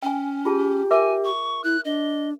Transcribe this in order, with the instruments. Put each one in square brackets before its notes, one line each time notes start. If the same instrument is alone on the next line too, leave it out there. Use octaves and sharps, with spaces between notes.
[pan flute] C#4 [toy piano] G5 G#5
[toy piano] F4 G#4 A5 [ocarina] G4
[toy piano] A#4 E5 D6 [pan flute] G#5
[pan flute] C#6
[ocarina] E4 [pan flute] F#6
[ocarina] D4 [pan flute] D#5